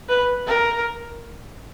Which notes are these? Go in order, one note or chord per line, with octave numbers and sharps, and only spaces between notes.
B4
A#4